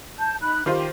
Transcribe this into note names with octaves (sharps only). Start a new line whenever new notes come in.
A5 G6
D#4 B5 F#6
D#3 F4 G4 C5